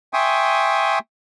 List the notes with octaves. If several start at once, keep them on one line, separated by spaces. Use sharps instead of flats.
E5 G5 G#5 C6 C#6 D#6